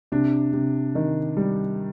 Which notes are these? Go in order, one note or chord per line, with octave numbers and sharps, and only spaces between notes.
C3 D4
C3
D#3
G3